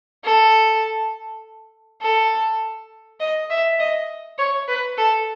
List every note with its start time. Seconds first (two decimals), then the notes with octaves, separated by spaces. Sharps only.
0.25 A4
2.02 A4
3.20 D#5
3.50 E5
3.79 D#5
4.38 C#5
4.68 B4
4.98 A4